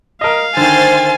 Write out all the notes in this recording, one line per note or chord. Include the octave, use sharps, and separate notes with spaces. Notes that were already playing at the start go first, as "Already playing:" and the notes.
A#4 D#5 F5
D3 D#3 C5 G#5 A6